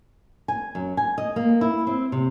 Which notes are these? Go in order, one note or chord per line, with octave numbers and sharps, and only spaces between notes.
G#5
F#2
G#5
D#5
A#3
E4
C4
C3